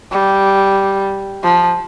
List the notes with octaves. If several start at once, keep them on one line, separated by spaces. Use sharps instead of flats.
G3
F3